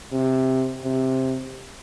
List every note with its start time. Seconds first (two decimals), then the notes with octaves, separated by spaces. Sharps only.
0.13 C3
0.84 C3